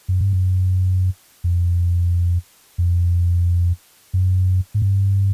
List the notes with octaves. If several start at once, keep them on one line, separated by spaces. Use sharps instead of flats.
F#2
G2
F#2
F2
F2
F#2
G#2
G2